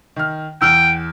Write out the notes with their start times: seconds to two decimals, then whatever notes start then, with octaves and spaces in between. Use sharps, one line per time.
0.16 D#3 F6
0.62 E2 G5 E6 F6